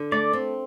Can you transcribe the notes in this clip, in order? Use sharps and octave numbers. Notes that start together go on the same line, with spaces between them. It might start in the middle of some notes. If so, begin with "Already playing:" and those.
Already playing: D3
A3 D5
C4